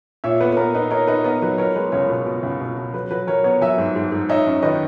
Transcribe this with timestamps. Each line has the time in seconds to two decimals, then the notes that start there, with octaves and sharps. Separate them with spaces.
0.24 A#2 C#5 E5
0.40 B3 B4
0.52 B4
0.57 B3 A#4
0.75 D#4 B4
0.91 D#4 A#4 C#5
1.08 D#4 B4
1.24 B3 A#4
1.42 F#3 B4
1.58 B3 A#4 C#5
1.76 G#3 B4
1.92 C#2 A#4 C#5
2.09 B2 B4
2.26 B2
2.43 C#2
2.60 B2
2.77 B2
2.93 F#3 B4
3.11 F#3 B4
3.27 F#3 A#4 C#5
3.44 B3 A#4 C#5
3.61 F#3 E5 G#5
3.78 G#2
3.96 G#2
4.12 G#2
4.29 D#4 C#5 E5
4.47 F#2
4.62 D#3 B4 D#5